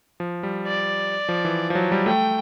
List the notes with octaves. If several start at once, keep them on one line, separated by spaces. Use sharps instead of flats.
F3
G3
D5
F3
E3
F3
F#3
G3
A3 G5